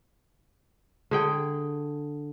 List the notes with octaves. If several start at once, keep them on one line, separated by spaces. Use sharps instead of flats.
D3 G#4 G5